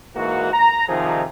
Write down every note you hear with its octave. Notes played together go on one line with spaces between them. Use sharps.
G#2 E3 A#3 F#4
A#5
C3 D#3 F3 G3 D#4 G#4